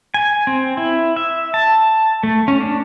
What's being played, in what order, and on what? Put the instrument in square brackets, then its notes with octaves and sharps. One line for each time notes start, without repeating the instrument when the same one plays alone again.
[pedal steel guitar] G#5
C4
E4
E5
A5
A3
C#4
D4